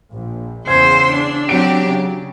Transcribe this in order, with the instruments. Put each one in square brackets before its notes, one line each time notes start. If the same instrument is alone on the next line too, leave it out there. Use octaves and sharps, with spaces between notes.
[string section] A#1
[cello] E2 C5 [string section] C#3 C6 E6 [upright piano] G#6
[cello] D4
[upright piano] F#3 D7 [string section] C4 G4
[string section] C#3